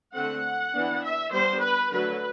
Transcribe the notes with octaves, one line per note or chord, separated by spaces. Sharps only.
D3 A3 C4 F#5
E3 B3 D4
E5
G3 B3 D4 C5
B4
D3 F#3 A3 B4